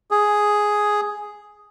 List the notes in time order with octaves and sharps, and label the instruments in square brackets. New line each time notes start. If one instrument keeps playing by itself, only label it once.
[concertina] G#4